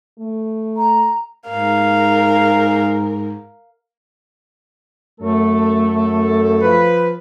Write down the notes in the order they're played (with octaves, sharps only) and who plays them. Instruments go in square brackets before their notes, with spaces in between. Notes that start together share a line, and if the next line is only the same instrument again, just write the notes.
[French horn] A3
[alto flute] A#5
[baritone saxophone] G#2 [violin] A#4 [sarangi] F5
[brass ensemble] F#2 A4 [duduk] A3
[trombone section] F3 B4